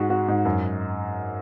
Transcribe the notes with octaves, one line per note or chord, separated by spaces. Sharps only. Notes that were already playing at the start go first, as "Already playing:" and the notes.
Already playing: G#2 F#4 G#4
F#4
G#2
F#2